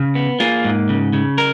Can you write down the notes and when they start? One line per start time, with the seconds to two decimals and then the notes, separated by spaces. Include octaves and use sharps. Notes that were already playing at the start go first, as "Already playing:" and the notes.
Already playing: C#3
0.15 B3
0.40 A#3 F4 G#4
0.64 G#2
0.89 C#3
1.13 C#3
1.38 A#4